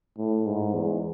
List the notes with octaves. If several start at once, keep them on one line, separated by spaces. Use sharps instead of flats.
A2
G#2
E2